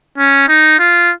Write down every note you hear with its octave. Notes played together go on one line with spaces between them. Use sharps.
C#4
D#4
F4